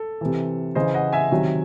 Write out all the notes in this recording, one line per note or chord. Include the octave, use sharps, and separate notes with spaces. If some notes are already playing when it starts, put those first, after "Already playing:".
Already playing: A4
C3 E3
C#3 E3 C5 D#5
D#5 F#5
E5 G#5
C3 D#3 F#3